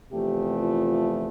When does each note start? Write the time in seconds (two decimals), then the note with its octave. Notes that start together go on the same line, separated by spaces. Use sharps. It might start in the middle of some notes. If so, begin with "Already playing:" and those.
0.12 E2 C3 F3 A3 G4
0.58 F4